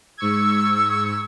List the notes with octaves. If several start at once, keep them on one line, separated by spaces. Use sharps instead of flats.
G#2 C#6 E6 G#6